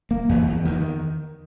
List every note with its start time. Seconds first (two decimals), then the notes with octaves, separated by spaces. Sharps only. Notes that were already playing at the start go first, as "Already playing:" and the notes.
0.11 A#3
0.29 E2
0.47 E2
0.65 D#3